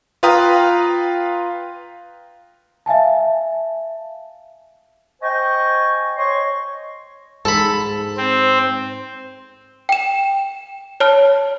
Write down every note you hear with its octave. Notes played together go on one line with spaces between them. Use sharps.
F4 B4 F5 G5 A#5 D#6
E5 F5 G#5 A5
C5 D#5 G5 G#5 C#6
C#5 D#5 C6 C#6
G#2 A4 B5
C4
G5 E7
C#5 A5 F6